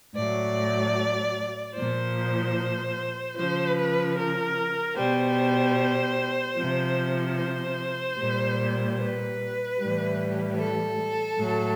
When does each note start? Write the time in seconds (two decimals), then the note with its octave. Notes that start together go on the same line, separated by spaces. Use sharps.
0.15 A2 F#3 D5
1.75 A#2 F3 C5
3.36 C#3 F3 C5
3.76 B4
4.17 A#4
4.96 B2 G3 C5
6.57 C3 F3
7.37 C5
8.19 A#2 G3
8.98 B4
9.78 A2 E3 G3
10.59 A4
11.39 A2 F#3